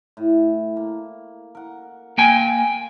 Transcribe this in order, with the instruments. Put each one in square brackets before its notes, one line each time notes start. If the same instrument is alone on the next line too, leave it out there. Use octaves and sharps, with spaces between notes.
[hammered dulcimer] A2
A#3
A#4 F#5
[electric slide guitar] A#3 G5 G#5